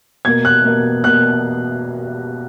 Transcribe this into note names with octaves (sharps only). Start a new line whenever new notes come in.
B2 A#3 G#6
F#6
B2 A#3
B2 A#3 F#6